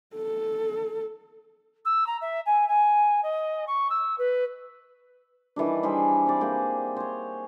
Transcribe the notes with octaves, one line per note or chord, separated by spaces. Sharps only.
A4
E6
A#5
E5
G#5
G#5
D#5
C#6
E6
B4
D#3 E3 G3 D4
G3 G#4 C5 E5
C4 D5
A#3 G#4 G5
C5 C#5